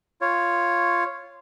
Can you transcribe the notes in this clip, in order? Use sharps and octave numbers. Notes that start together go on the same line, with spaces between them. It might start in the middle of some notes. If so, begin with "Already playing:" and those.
F4 C#5